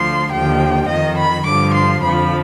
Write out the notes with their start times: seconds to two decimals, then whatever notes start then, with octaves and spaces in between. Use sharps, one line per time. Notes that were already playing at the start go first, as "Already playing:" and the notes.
Already playing: D2 D3 F3 C6
0.31 D#2 D3 F3 G5
0.89 F2 D#3 D#5
1.18 B5
1.46 G2 D3 F3 D6
1.75 C6
2.03 F2 D3 F3 B5